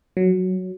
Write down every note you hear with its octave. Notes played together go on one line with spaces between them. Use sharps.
F#3